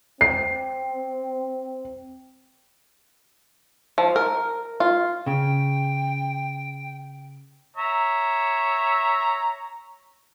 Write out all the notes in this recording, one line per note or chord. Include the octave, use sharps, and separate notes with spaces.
C4 C7
F3
A#4
F4
C#3 G5
C#5 E5 A#5